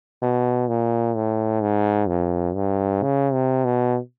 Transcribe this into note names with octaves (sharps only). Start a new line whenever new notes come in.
B2
A#2
A2
G#2
F2
G2
C#3
C3
B2